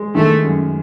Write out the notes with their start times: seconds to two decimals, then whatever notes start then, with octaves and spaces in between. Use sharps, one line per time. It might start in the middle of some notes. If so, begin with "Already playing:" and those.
Already playing: G#3
0.15 D#3 A3
0.43 F#2